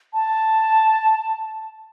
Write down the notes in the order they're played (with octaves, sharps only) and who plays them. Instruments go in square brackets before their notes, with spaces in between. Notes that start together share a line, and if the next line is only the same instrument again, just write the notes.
[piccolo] A5